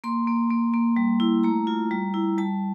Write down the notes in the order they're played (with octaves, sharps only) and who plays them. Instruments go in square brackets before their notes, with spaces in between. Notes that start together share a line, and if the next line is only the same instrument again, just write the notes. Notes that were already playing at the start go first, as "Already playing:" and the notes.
[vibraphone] A#3 C6
A#3
A#3
A#3
G3
E4
A3 A#5
F4
G3
E4
G3 A5